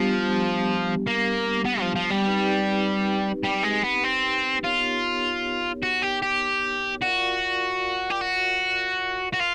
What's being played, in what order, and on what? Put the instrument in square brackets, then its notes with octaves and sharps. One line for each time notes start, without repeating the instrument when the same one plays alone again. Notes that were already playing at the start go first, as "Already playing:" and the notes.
Already playing: [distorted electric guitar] F3 [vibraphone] G3 B3 D4 G4
[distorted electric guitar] A#3
B3
F3
F3
G3
[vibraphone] C4 D#4 G4 B4
[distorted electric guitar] G3
G#3
B3
C4
[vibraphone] B3 D#4 G4 A#4 C#5 [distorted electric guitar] F4
[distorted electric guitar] F#4
G4
G4
[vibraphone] F4 A#4 D5 F5 [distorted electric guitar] F#4
[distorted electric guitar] G4
F#4
F#4
F4